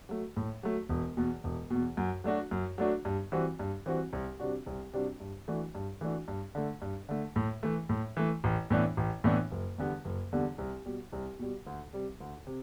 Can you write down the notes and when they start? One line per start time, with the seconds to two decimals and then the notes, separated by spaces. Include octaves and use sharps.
0.09 F#3 A3
0.37 A2
0.63 F#3 A3
0.89 E1
1.17 E2 B2
1.44 E1
1.70 E2 B2
1.97 F#2
2.24 F#3 A3 D4 F#4
2.51 F#2
2.78 F#3 A3 D4 F#4
3.05 G2
3.32 E3 G3 C4 F#4
3.59 G2
3.86 E3 G3 C4 F#4
4.13 C2
4.40 C3 G3 D4 F#4
4.66 C2
4.93 C3 G3 D4 F#4
5.20 G2
5.48 E3 A3 D4 F#4
5.75 G2
6.01 E3 A3 D4 F#4
6.28 G2
6.55 D3 A3
6.82 G2
7.09 D3 A3
7.36 A2
7.63 E3 A3
7.89 A2
8.17 E3 A3
8.44 A1
8.70 A2 E3 B3 D4
8.97 A1
9.24 A2 E3 B3 D4
9.51 F#1
9.78 E2 D3 G3 B3
10.05 F#1
10.32 E2 D3 G3 B3
10.58 C2
10.86 B2 G3
11.13 C2
11.39 B2 G3
11.67 D2
11.93 C3 G3
12.20 D2
12.47 C3